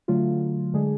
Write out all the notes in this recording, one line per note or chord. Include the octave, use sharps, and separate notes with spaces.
D3 F#3 A3 F4
D3 G#3 D4 G#4